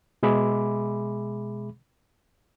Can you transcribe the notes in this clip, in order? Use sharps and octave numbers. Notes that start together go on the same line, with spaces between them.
B2 G#3 G#4 E5 B5 D6